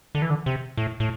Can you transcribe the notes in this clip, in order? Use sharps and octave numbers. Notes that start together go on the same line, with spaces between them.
D3
E3
D3
C3
A2
A2